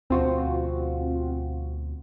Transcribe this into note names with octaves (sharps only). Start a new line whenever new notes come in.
D2 B2 F3 C4 F4 F#4